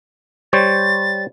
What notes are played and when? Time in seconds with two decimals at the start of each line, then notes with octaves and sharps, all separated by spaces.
0.53 G3 C5 C#5 A6